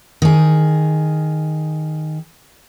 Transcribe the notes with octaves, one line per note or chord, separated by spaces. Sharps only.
D#3 G#4